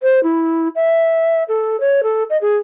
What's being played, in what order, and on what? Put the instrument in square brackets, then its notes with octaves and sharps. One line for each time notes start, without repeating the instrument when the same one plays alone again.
[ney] C5
E4
E5
A4
C#5
A4
D#5
G#4